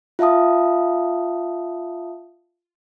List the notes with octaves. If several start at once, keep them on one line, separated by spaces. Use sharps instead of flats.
F4 E5 F5 A5 D#6